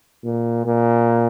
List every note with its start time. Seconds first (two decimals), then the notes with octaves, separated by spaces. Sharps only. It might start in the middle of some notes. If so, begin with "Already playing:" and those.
0.24 A#2
0.66 A#2